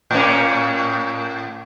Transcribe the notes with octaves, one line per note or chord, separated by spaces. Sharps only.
A2 A#3 C#4